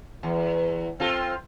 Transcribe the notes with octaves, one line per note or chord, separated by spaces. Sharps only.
E2
C4 F4 A4